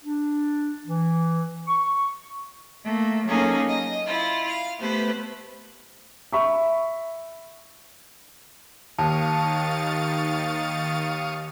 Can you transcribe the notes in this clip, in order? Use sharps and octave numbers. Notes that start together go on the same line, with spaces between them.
D4
E3
C#6
A3 A#3
F#3 A#3 C#4 D#4 G#4 A4
D#5
E4 F4
F5
A3 B3 G4 B4 C5
E5 B5 C#6
D#2 D#3 F5 A5 C#6 D#6 A6